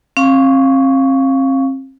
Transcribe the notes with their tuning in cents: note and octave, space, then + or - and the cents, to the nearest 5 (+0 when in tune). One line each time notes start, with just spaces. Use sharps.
C4 +40 F5 +0 C#6 +15